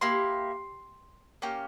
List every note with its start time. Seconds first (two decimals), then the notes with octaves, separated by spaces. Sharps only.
0.01 A#3 E4 G4 C6
1.42 A#3 C#4 G4